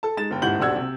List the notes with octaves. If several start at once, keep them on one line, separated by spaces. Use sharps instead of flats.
A4 A5
G#3 D#4 A6 E7
G1 G5
D#1 G#2 E4 F#5 G6 F#7
D#1 B1 D4 F#5 E6 G#6
C3